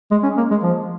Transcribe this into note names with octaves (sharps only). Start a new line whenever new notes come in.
G#3
C#4
A#3
G#3
F3